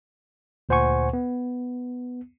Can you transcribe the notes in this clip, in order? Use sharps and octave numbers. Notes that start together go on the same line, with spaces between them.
D2 A#2 C5 F#5 G#5 C#6
B3